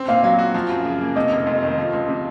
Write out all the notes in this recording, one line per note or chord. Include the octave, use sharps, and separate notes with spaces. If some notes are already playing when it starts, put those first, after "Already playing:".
Already playing: C4
A#2 F5
F#3 F5
F#4
F3
F#2
C#3
A#3
C3 D#5
F1
F2
D#3
F3
C#2
C3